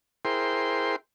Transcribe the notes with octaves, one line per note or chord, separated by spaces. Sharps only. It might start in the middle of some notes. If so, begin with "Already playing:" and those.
E4 G#4 A#4 C5 G5 C6